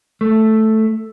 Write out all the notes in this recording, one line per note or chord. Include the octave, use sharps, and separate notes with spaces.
A3